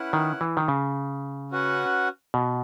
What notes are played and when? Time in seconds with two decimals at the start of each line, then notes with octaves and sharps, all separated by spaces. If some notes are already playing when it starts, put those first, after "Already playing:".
Already playing: C#4 E4 B4 F#5
0.13 D#3
0.41 E3
0.57 D#3
0.68 C#3
1.51 C#4 F#4 B4 F#5
2.34 B2